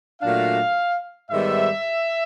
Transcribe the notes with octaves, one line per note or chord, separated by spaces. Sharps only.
A#2 F#3 A3 D4 F5
G#2 D#3 G3 B3 E5